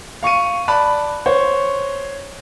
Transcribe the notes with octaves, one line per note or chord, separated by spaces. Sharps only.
F5 C#6 C#7 D#7
D5 A5 B5 F#6
C5 C#5 C#6